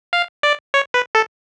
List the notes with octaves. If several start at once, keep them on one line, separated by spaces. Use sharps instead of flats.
F5
D5
C#5
B4
A4